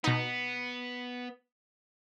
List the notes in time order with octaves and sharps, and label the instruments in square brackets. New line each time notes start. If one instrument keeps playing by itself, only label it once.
[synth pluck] B2 D#4 [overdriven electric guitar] B3